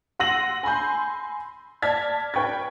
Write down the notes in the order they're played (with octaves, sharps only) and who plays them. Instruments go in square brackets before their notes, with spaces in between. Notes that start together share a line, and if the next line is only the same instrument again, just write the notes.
[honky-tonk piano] F#5 C6 E6 A#6 D#7 F#7
G#5 B5 C6 G6
D5 A5 F6 G#6 B6
B4 G5 C#6 G#6